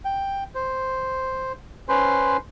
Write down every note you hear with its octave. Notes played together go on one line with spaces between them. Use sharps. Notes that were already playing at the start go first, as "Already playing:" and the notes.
G5
C5
C#4 B4 C5 C6